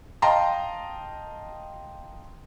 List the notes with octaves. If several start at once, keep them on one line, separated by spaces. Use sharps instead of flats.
D#5 F5 G5 A5 A#5 C6